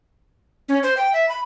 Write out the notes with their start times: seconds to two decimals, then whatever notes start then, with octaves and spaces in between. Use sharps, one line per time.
0.69 C#4
0.83 C5
0.97 G5
1.13 E5
1.29 B5